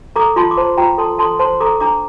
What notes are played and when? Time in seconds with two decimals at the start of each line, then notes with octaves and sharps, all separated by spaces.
0.16 A4 A#5 D6
0.36 F4 A5 C6
0.51 D6
0.57 C5 A5 C6
0.77 F4 G5 A#5
0.98 A4 A5 C6
1.18 A4 A5 C6
1.39 C5 A5 C6
1.60 A4 A#5 D6
1.80 D4 A#5 D6